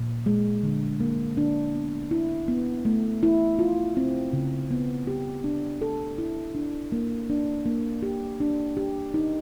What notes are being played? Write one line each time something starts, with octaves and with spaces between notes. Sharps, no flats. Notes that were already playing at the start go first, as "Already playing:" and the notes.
Already playing: A#2
G#3
D3
A#3
D4
B3
E4
B3
A3
E4
F4
C4
C#3
B3
G4
D4
A4
E4
D4
A#3
D4
A#3
G4
D4
G4
D#4